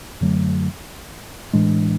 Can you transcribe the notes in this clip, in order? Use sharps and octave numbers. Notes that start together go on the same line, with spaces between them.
F#2 D3 F#3 A3
A2 E3 G#3 D4